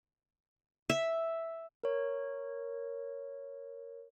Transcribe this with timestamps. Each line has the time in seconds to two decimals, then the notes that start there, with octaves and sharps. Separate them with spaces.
0.90 E5
1.84 A#4 C#5